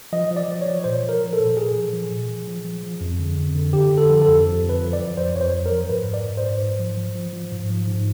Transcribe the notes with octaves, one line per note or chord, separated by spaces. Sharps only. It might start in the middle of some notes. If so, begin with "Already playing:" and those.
F3 D#5
F3
D5
F3
F3 C#5
A#2 C5
F3
A#4
F3
A4
A#2
A#2 G#4
F3
F3
A#2
F3
F3
F3
F3
F2
D3
F2
D3
D3 G4
D3
A4
F3
A4
F2
F3
F2
B4
F3
D5
F3
F2 C5
F2 C#5
C5
F2
A#4
F3
G#2 B4
G#2
D5
G#2
C5
G#2
G#2
F3
F3
F3
F3
G#2
F3
G#2